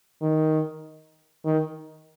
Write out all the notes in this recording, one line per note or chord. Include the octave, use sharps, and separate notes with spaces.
D#3
D#3